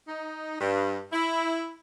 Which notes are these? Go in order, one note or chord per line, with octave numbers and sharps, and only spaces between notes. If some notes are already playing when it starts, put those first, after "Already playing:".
D#4
G2
E4